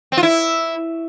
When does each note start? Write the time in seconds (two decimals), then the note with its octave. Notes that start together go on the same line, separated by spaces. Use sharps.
0.12 C4
0.17 F4
0.23 E4